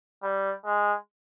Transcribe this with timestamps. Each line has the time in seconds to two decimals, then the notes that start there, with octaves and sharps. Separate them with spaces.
0.23 G3
0.65 G#3